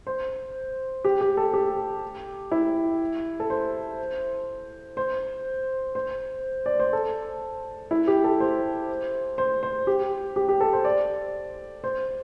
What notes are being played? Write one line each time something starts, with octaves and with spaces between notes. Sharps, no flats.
C5
G4
G4
A4
G4
E4
A4
C5
C5
C5
D5
C5
A4
E4
G4
A4
C5
C5
C5
G4
G4
G4
A4
C5
D5
C5